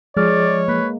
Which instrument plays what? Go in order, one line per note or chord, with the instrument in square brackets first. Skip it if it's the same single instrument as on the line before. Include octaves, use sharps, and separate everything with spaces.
[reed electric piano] F3 G#4 F6 [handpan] G#3 [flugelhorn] C#5 [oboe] D5
[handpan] A#3 [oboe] B4